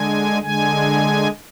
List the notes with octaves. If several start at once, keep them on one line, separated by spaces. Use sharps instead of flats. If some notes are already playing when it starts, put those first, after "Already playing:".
Already playing: D3 G#3 G#5
D3 G#3 G#5